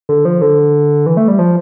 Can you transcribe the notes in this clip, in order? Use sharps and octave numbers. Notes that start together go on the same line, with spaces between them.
D3
F3
D3
E3
A3
G3
F3